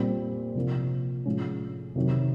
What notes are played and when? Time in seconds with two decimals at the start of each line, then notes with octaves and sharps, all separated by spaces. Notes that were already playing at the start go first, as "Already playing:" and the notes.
Already playing: A#2 G3 C4
0.55 C3 F3 A#3
1.26 A2 F3 G#3 C#4 F4
1.96 C3 D#3 F#3